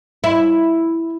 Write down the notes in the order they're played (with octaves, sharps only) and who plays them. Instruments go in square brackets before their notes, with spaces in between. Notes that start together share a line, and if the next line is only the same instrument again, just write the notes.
[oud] E4